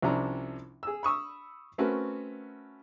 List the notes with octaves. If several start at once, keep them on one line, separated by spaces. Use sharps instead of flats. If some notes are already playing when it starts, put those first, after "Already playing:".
C2 C3 F3 C#4 D4 A#5
G#4 E6
B5 C#6 D#6 E6
A3 C4 C#4 F#4 A#4 B4